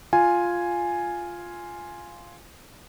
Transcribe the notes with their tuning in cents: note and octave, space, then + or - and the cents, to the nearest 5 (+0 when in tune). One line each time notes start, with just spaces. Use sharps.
F4 +0 G#5 +0